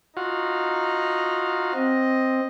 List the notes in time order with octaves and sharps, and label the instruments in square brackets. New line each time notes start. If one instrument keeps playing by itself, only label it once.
[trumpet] D#4 [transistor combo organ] F4 F#4
[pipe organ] C4 [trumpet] D#5